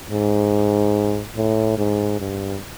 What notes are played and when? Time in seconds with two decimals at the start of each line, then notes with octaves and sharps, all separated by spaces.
0.11 G#2
1.37 A2
1.78 G#2
2.20 G2